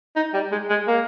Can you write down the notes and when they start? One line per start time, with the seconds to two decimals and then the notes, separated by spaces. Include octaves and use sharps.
0.16 D#4
0.33 G3
0.51 G#3
0.69 G#3
0.88 A#3